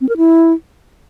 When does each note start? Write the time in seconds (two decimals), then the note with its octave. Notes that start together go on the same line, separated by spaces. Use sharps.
0.01 C4
0.09 A#4
0.17 E4